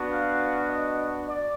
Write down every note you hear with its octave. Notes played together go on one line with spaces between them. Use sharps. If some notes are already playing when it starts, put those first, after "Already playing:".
Already playing: B3 D4 F#4
F5
D#5
D5